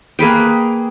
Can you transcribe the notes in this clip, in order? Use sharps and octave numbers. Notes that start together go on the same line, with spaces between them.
A#3 G#4 B4 G5